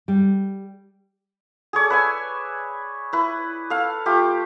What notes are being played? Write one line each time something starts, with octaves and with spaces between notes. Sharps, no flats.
G3
G#4 A4 C#5 D5
B4 E5 G#5
E4 B4
A4 F5
A3 F4 G4